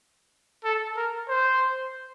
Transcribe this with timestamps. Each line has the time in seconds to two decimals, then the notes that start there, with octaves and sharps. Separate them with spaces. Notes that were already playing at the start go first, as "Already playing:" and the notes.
0.64 A4
0.96 A#4
1.29 C5